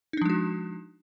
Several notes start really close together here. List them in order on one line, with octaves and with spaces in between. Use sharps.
D#4 D4 F3 G#3 F#4